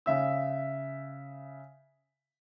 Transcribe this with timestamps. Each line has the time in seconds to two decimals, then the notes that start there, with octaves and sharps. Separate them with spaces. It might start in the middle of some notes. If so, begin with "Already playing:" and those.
0.06 C#3 E5 E6